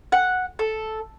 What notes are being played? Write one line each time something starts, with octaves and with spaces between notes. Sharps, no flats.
F#5
A4